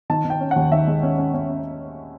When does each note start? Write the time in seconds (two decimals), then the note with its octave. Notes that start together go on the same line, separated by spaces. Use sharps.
0.10 D#3 A5
0.25 D#3
0.30 G5
0.41 C#4
0.51 D#2 F#5
0.71 D#3 E5
0.87 G#3
1.03 C#4
1.18 C#4
1.34 C#4